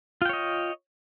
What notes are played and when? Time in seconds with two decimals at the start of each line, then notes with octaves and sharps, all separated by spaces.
0.22 F4
0.25 G5
0.29 C#5
0.33 D#5